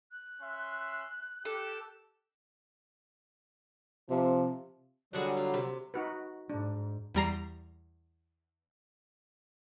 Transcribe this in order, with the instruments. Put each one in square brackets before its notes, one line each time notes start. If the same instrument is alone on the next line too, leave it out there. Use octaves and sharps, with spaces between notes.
[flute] F#6
[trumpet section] C#4 E5 C6
[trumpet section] G4 [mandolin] A4
[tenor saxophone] C3 [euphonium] F3
[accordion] D3 F#3 G3 [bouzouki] D4 F#4 G#4
[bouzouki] F4
C3
[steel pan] D#4 F#4 B4
[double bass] G#2 [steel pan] D4
[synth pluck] E2 G3 A#5 C7